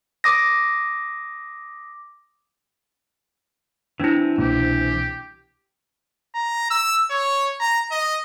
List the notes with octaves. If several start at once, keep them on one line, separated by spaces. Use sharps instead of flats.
D6 D#6 A#6
E3 C4 D4 E4
C2 B2 A#3 G4
A#5
E6
C#5
A#5
D#5